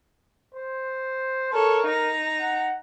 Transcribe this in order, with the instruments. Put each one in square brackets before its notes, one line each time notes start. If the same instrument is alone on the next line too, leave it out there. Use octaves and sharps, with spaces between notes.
[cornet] C5
[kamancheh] A4 C#5 [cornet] A#4
[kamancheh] D#4 A#5
[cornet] F#5